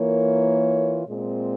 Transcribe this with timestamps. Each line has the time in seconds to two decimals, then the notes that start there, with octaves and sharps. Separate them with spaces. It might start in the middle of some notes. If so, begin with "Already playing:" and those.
Already playing: E3 A#3 F4 A#4 C#5
1.07 A#2 G#3 C4